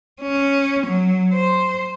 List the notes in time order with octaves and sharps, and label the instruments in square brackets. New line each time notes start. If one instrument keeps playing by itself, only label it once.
[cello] C#4
F#3
C5